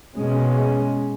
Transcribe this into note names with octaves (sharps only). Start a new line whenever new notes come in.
B2 G#3 C#4